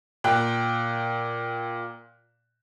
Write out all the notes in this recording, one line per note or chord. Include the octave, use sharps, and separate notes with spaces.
A#2 G5 F#6